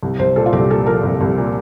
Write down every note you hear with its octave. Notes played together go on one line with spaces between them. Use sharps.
C2
C2 C5
A#2 A4
F4
C2 G4
A#2 A4
F3 A#4
C2
C2
A#2